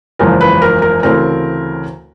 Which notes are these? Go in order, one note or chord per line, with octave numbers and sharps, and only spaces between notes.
F#1 E2 C#3 F3 G#3 A#4
B4
A#4
A#4
D2 C#3 E3 A3 C4 A#4